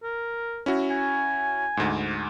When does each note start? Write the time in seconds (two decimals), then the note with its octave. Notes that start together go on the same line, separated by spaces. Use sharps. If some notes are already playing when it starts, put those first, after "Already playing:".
0.03 A#4
0.66 C#4 E4 F#4
0.91 G#5
1.77 D2 G#2